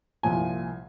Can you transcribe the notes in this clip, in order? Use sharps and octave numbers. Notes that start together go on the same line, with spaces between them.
C2 A#2 F3 G#5